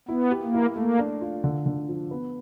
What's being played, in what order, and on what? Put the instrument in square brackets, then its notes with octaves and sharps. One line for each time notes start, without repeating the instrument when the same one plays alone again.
[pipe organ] B3 [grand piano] E4
[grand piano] G4
[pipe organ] A#3
[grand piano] E4
[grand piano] A3 [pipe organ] A#3
[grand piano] D4
F4
D3
D3
F3
B3